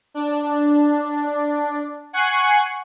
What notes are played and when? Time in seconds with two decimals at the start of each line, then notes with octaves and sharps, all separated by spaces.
0.14 D4
2.13 F#5 G#5 C#6 F#6 C7 C#7